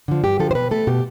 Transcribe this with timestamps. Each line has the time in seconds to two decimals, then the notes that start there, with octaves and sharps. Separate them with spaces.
0.08 D3 F3
0.24 G2 G4
0.39 D3 F3 A4
0.51 C5
0.55 B2 B4
0.71 A3 A4
0.87 B2 G4